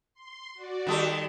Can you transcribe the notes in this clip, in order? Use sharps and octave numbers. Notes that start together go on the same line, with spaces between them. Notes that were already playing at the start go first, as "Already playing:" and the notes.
C6
F#4 D5
D#3 G3 A4